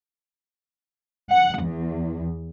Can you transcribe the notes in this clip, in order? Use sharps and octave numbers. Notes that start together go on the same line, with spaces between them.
F#5
E2